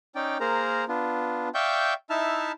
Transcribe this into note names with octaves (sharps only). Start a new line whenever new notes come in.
C#4 D#4 D5 G5
A#3 G#4 A#4 C5 A#5
B3 D4 F4
D5 E5 F5 G5 C#6 G6
D#4 E4 E5 A5 F6